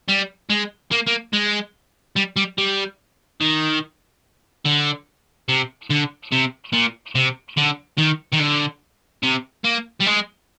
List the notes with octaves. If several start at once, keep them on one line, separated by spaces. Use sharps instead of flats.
G3
G#3
A#3
A#3
G#3
G3
G3
G3
D#3
D3
C3
D3
C3
A#2
C3
D3
D#3
D#3
D3
C3
A#3
G3
G#3